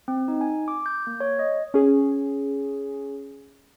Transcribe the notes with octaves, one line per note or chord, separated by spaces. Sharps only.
C4
D#4
G#5
D6
G6
A#3
C#5
D#5
C#4 G#4